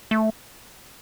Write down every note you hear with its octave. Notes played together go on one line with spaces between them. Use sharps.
A3